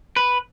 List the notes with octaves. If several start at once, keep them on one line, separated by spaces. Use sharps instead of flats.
B4